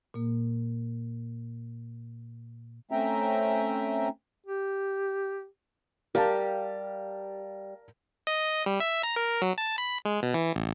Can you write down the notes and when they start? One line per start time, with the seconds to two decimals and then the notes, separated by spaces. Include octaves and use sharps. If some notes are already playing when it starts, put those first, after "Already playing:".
0.14 A#2 A#3
2.91 A3 C4 C#4 E5 G5 A#5
4.46 G4
6.15 G3 G4 A#4 F5 A5
8.27 D#5
8.66 G3
8.80 E5
9.03 A#5
9.16 A#4
9.42 F#3
9.58 A5
9.78 B5
10.05 G#3
10.23 B2
10.34 E3
10.56 A1